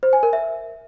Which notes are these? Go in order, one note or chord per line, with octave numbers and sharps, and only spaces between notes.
C5
G#5
A#4
E5